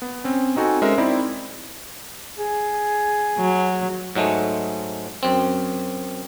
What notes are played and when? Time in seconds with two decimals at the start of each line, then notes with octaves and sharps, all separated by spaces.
0.02 B3
0.24 C4 C#4
0.56 C4 D#4 F#4 A4 G#5
0.82 G#3 C#4 A#4 C5 E5
0.98 C4 D#4 E4 D5
2.38 G#4
3.38 F#3
4.15 G#2 F#3 G#3 A3
5.23 F#2 C4